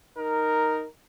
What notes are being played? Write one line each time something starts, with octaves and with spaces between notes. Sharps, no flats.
D#4 A#4